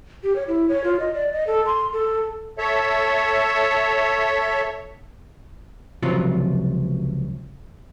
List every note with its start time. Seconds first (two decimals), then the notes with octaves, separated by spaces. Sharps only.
0.24 G4
0.36 C#5
0.48 E4
0.69 C#5
0.84 F4
1.00 D#5
1.14 D5
1.33 D#5
1.47 A4
1.66 C6
1.93 A4
2.58 A4 C#5 E5
6.03 C#2 C3 F3 F#3 F4